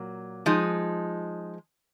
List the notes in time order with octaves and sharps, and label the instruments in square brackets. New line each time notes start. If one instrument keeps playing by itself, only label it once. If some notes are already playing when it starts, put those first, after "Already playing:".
Already playing: [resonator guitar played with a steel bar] A#2 F#3 A#3
F3 G#3 D#4